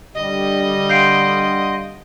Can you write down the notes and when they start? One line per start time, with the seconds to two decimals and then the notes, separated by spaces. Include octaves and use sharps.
0.15 D3 G3 D#5
0.89 F5 F#5 C6 G6 C7 D7